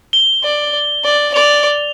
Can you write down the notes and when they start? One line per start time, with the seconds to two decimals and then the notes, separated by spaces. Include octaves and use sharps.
0.13 G7
0.43 D5
1.04 D5
1.34 D5 F7